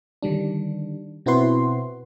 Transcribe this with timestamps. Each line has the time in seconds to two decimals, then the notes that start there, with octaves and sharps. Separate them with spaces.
0.23 D3 D#3 G3 D4
1.26 B2 C4 E4 F#4 B4 C6